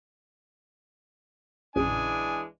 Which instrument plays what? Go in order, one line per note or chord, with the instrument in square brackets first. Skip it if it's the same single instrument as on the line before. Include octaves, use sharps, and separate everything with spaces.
[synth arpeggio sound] A#1 F#2 C#3 [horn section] E3 G#3 D4 [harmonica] G#5 [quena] D#6